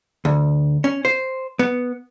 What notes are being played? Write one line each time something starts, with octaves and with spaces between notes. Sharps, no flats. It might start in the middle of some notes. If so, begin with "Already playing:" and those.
D2
C#4
C5
B3